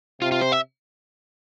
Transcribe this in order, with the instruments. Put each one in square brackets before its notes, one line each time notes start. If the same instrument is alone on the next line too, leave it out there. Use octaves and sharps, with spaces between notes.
[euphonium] C3 [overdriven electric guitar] F4
[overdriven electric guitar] F4
C5
E5